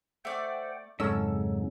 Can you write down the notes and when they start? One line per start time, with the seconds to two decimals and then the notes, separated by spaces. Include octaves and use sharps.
0.25 A3 C5 D5 F#5 G5
1.00 F2 G#2 C#3 F#3 C#4 A4 E6